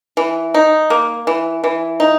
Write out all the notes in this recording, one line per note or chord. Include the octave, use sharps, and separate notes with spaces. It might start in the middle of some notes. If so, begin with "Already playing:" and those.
E3
D#4
A#3
E3
E3
D#4